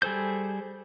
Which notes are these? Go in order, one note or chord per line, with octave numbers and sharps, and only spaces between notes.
G3 G#4 A4 C5 G6